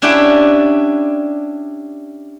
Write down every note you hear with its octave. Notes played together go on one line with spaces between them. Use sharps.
C#4 D4 E4 G4 F#5 G5